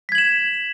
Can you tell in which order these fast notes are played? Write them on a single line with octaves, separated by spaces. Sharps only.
B6 G#6 F#7 E7